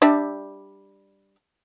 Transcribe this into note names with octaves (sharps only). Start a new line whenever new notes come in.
G3 D4 E5